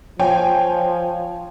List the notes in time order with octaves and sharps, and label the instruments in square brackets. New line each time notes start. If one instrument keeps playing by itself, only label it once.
[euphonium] F3 [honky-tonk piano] C#5 G5 G#5